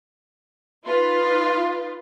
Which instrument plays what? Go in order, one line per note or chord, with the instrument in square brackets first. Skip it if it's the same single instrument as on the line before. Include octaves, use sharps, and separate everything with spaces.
[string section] D#4 F4 B4